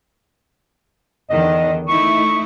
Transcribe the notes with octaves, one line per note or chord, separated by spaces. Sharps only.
E2 D3 D#3 D#5
A3 D#4 E4 C#6